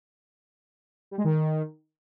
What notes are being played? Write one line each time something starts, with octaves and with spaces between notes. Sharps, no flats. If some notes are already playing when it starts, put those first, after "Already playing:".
G3
G#3
D#3